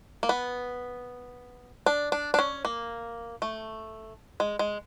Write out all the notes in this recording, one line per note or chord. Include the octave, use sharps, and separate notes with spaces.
A#3
B3
D4
D4
D4
C#4
A#3
A3
G#3
G#3